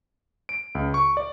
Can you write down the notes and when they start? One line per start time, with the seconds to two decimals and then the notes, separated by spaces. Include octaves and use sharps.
0.49 D7
0.75 C#2
0.94 C#6
1.17 D5